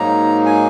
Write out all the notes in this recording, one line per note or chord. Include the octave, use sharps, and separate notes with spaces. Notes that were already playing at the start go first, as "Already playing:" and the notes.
Already playing: G#2 F#3 A#3 D#4 A#5
G#5